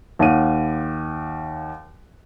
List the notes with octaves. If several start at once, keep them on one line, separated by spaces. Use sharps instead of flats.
D#2 F5 F#5 D#7